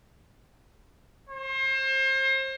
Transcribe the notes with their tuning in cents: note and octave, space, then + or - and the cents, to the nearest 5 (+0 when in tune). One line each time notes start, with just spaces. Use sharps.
C5 +35